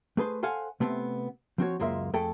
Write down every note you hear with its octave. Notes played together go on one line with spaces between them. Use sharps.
A3 G#4 B4 C5
A4 C5 F5 F#5 G#5
C3 A3 B3 C4
F3 C4 F#4 C#5
C#2 F#2 G#3 A#3 F4 E5
F2 A3 G#4 A4 G5